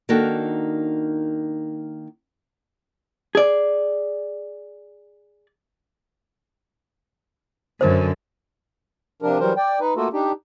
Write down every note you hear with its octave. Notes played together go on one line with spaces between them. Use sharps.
D#3 A#3 D4 D#4 F#4 A4
G#4 D5
F#2 D3 A#4 C5
C3 F3 D4 A#4
E3 F#3 G3 A#4 C5
D5 G5
D#4 B4
A3 A#3 F4 F#4 A4
D4 D#4 G4